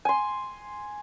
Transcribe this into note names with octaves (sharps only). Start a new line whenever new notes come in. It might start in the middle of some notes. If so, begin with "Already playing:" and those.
G#5 C6